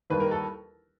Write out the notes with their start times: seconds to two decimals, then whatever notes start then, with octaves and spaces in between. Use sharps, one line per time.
0.10 D#2 D#3 G3 A#3 B4
0.20 A#4
0.31 A4